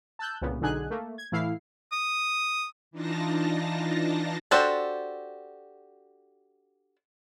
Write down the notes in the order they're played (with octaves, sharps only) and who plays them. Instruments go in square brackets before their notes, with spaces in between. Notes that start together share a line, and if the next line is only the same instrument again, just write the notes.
[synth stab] A5 E6 F#6 G6
C2 A#2 C#3 B3
B1 D3 D#4 G#4 G#5 F#6
A3 A#3
G#6
A2 E3 E4 F5 C7
[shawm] D#6
[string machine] E3 D4 D#4 F4 A5 A#6
[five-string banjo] D4 F#4 G4 A4 C5